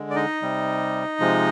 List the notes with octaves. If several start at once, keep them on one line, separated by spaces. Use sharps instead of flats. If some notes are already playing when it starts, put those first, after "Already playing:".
Already playing: D3 G#3
D5
D#4 D#5
C3 G3
C3 F3 G#3